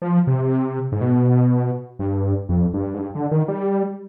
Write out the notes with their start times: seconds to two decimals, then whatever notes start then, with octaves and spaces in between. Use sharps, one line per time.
0.02 F3
0.27 C3
0.92 G#2
1.01 B2
1.99 G2
2.49 F2
2.74 G2
2.94 G#2
2.99 G2
3.15 D3
3.31 D#3
3.48 G3